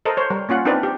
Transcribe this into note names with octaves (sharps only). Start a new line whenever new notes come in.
A4 A#4 C5 D#5
C5 C#5
G3 A#4
A#3 C#4 F4 F#5
C4 D4 D#4 A#4 B4 D5
G4